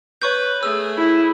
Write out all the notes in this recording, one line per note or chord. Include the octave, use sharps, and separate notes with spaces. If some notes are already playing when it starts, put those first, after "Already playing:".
B4 C#5 C#6 G6
A3 G#4 E6
E4